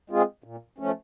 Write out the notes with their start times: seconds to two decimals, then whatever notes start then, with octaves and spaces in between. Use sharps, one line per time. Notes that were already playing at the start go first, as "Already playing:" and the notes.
0.10 G#3 C4 F4 G#4
0.44 A#2
0.78 F3 A3 C#4